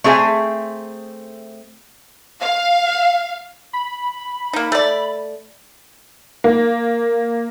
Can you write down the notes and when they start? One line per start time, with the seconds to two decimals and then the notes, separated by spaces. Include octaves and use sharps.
0.04 A3 C4 G#4 E5 G#5
2.41 F5
3.73 B5
4.53 A#3 D#4
4.72 A3 D5
6.44 A#3